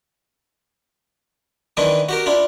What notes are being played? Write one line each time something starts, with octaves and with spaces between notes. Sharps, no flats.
D#3 E3 C4 D4 E4
F#4 G4 A#4
D4 E4 F4